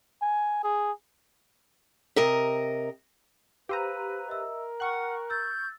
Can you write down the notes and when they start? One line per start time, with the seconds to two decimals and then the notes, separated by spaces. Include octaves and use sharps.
0.22 G#5
0.64 G#4
2.16 C3 A#4 D#5
3.69 G4 B4 C5 F5 A#5 E6 D#7
4.28 A#4 D#5 E5 E6
4.80 F#5 G5 C#6 F6 F#6
5.30 E6 G6 A6